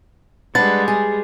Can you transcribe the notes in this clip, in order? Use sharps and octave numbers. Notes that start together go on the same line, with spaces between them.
G3 G#3 D4 B4 F#5 A6
G#4